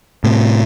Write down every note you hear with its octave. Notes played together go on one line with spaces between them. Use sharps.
A2 C3